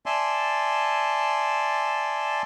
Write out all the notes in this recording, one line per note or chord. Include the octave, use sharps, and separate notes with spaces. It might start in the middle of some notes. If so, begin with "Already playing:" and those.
D5 E5 G#5 A5 C6